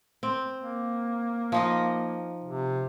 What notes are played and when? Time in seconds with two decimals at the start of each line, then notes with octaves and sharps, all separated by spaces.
0.23 C4
0.59 A#3
1.52 F3 D#4 D#5
2.45 C3